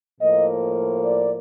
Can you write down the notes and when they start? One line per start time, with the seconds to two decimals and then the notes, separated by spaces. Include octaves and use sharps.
0.19 A2 F3 A#3 D#5
1.05 D5